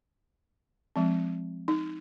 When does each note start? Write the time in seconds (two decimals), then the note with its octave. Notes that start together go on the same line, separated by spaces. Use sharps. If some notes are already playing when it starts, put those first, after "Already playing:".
0.96 F3 G#3 C4
1.68 D#4